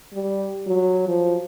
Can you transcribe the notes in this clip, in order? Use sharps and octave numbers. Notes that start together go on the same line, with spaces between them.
G3
F#3
F3